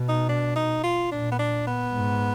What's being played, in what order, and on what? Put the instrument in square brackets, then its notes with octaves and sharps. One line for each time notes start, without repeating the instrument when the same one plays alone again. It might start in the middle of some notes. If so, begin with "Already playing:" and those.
Already playing: [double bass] B2
[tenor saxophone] D#4
D4
D#4
F4
[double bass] A#2 [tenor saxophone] D4
[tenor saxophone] B3
D4
B3
[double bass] G#2